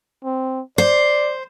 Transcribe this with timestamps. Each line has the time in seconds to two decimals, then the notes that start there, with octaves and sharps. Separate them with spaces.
0.24 C4
0.78 C5 D5